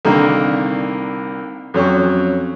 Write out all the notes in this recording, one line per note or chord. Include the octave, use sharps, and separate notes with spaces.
C2 D3 D#3 A#3 D#4
F2 F#3 C#4 C#6